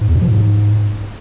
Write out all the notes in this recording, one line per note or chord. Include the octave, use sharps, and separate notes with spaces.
G#2
E2
B2
F3
G#2